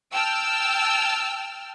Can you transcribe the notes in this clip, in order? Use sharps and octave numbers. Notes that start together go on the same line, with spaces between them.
G5 A5 E6 F6